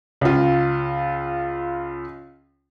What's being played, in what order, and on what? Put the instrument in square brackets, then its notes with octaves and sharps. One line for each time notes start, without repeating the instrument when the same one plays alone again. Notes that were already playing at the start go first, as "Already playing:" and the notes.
[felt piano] C#2 F4